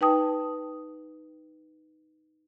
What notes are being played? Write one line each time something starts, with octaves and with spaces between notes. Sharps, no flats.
D#4 B4 G5 A5 D#6